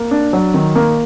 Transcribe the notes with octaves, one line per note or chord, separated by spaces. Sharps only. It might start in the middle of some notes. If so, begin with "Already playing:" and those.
Already playing: A#3
D4
F#3
D#3
A#3